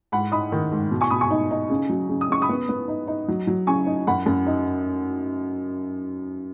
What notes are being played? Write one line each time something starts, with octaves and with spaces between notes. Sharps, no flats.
G#2 F#5 B5
D#4 B5 D#6
D#3
G#2
B2
G#5 C#6
B2 B5 D#6
G#5 C#6
D#4
D#4
C#3
F#3
C#3
D#6
C#3 C#6
B5 D#6
B3
B3
D#4
D#4
F#3
F#3
C#3 G#5 C#6
D#4
F#2 F#5 B5
F#2
D#4